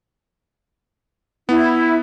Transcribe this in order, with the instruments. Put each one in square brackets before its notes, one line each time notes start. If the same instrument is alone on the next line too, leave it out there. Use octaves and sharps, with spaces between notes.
[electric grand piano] B3 [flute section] E4